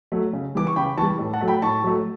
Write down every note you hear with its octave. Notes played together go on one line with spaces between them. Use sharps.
F#3 A3
C#3
E3 G3 D6
C#6
C#3 G5 B5
E3 G3 A5 C#6
A2
F#5 A5
F#3 A3
G5 B5
A2 A5 C#6
F#3 A3